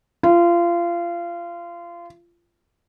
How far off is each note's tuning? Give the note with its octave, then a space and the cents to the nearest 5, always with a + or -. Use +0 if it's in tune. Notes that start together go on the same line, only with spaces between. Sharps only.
F4 -25